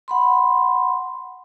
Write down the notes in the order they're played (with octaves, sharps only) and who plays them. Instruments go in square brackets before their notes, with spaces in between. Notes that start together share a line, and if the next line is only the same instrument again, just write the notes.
[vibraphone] F#5 B5 C6